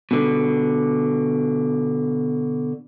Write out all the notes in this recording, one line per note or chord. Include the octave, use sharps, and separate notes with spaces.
B2 D3